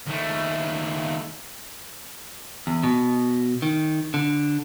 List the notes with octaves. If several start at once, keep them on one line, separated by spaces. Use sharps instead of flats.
D#2 A3
E2
B2
D#3
D3